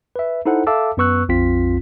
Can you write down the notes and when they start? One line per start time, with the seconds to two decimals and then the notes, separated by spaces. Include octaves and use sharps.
0.16 B4 E5
0.46 D#4 E4 A4 C5 F#5
0.67 A4 E5 F5 A5 D6 E6
0.97 F#2 B3 B4 C#6 E6 F#6
1.29 A#1 F2 C4 F4 B6